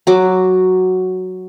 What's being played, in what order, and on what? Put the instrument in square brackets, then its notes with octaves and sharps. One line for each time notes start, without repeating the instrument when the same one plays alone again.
[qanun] F#3 F#4 D6